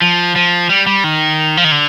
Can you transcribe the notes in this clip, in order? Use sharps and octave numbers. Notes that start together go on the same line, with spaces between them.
F3
F3
G3
G3
D#3
F3
D#3
D3